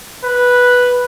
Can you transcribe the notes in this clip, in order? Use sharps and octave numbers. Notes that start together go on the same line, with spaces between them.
B4